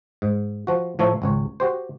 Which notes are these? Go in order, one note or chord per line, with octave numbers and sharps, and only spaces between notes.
G#2
F3 F#4
A2 F3 C#5 E5 A5
G#1 C#2 C#5
F#4 G4 C5